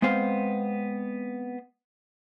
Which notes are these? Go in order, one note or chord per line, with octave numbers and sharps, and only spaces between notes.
G#3 B3 C4 C5 F5